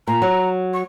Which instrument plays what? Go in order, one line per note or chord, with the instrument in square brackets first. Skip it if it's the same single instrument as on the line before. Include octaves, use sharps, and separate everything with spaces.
[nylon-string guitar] A#2 [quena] A#5
[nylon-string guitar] F#3
[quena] C#6